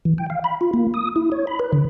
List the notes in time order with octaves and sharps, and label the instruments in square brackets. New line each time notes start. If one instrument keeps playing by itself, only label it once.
[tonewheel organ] E3
G5
F5
B5
F4
A#3
D#6
E4
C#5
B5
B4
D3